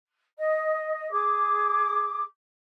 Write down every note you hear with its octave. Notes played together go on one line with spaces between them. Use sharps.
D#5
G#4 D6